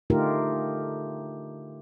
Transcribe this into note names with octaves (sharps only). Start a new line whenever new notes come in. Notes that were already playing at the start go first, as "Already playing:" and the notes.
D3 A3 D#4 F4 G4 A#4